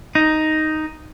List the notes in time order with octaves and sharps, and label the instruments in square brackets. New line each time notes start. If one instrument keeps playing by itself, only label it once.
[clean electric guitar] D#4